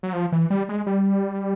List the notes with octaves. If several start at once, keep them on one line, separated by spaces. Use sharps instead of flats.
F#3
F3
E3
G3
G#3
G3